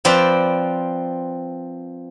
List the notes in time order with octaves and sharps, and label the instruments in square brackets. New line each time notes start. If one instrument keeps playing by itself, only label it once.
[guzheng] F3 C4 B4 D5